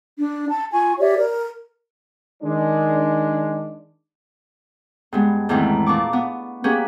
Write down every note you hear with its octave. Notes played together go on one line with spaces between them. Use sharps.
D4
A5
F4 G#5 C#6
G4 C#5 D5 E5
A#4
D#3 G#3 D4
G2 G#3 B3
E2 G#2 D#3 E3 A3 C4
A#2 D4 C#6 D6
B3
A#3 B3 C#4 G4 G#4 B4